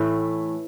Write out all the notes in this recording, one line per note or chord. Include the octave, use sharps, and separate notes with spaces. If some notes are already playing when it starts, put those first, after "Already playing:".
Already playing: A2 E3 A3